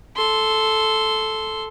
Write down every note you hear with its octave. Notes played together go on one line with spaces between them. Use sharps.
A4 C6